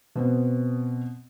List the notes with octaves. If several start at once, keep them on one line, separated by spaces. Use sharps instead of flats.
B2 B3 C4